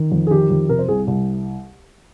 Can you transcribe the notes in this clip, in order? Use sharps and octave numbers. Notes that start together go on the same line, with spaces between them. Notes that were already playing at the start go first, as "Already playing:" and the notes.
Already playing: D#3
F2
G#4
D#3 G4
F2
C3 A#4
C5
C2 G#4
C2